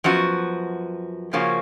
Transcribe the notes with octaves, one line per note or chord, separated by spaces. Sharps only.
F#2 F3 B3 F#4
C#3 F3 A#3 C#4 F#4